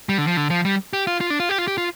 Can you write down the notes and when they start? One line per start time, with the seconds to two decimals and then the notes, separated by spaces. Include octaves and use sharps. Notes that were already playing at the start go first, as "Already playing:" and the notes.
0.09 G3
0.18 D3
0.27 F3
0.37 D3
0.50 F3
0.65 G3
0.93 G4
1.07 F4
1.21 F4
1.30 D4
1.40 F4
1.49 G4
1.58 F4
1.68 G4
1.78 F4